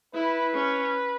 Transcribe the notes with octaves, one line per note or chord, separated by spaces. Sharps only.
E4 B4
C#4